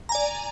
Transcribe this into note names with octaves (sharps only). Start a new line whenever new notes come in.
D5 G#5 A#5